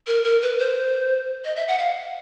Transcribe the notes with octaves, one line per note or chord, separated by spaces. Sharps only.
A#4
A#4
B4
C5
D#5
E5
F#5
F5